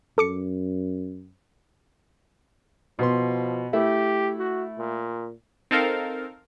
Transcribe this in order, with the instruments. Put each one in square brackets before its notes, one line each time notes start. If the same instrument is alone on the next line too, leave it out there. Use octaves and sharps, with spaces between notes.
[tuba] F#2 [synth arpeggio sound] A4 D6 C#7
[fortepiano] B2 B3 C6 [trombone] F3
[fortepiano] A3 E4 [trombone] G4
[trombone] F#4
A#2
[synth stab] C4 D#4 A4 A#4 F5